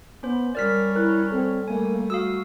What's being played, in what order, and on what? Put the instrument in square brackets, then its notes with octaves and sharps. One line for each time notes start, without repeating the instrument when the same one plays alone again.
[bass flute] B3 [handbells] C#4 C5
[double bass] G3 C#4 [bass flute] A#4 [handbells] D5 F6 B6
[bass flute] E4 [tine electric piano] A#4 F#6
[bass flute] C4 [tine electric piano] A4
[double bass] G3 A3 [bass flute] A#3 [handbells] G#5
[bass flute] F#4 [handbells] F5 D#6 E6